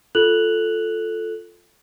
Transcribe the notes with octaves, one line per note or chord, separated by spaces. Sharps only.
F4 A4 F#6 F7 F#7